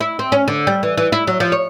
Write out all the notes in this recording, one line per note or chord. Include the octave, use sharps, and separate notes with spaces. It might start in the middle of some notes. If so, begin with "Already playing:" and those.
E4
C4
C#4
D3
G3
E3
E3
E4
F#3
F3
C#5